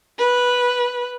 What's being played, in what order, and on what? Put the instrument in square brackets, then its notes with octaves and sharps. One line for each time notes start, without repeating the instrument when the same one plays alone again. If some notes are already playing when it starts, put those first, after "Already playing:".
[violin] B4